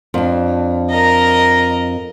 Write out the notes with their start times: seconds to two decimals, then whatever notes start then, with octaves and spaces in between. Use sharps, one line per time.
0.14 F2 D4
0.90 A#4 D#5